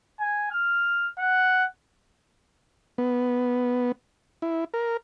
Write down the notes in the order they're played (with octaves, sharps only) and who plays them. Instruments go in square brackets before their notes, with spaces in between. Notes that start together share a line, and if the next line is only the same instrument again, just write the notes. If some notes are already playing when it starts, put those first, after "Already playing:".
[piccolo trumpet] G#5
F6
F#5
[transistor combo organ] B3
E4
A#4